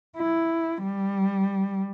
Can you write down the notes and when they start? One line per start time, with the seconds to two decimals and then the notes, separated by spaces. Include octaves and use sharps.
0.18 E4
0.84 G3